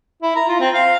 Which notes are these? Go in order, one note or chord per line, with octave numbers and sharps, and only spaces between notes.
E4
A#5
F4
C4
F5